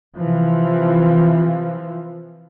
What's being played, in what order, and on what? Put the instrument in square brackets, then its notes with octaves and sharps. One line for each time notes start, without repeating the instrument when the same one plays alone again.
[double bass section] C3 E3 F3